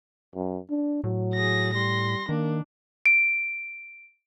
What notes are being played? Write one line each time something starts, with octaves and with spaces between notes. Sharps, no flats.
F#2
D4
A2 F#3
G#4 A#6
G3 C6 A#6
D#3 A#3 D4
D7